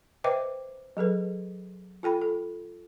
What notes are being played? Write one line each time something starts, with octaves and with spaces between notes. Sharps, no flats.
B4 C5 D#5 E5 G5 D6
F#3 G#4 A4 B4
F4 A4 G5 B5
A4